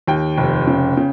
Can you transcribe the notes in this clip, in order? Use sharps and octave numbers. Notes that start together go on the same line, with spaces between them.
D#2 G5
F1
C#3
C#3